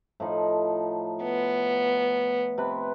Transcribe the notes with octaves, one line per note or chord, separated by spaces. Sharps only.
A2 F3 D#4
B3
C3 B4